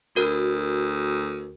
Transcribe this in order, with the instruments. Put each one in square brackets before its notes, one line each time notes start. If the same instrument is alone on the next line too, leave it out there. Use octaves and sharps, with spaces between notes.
[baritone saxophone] D2 [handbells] F#4 A#4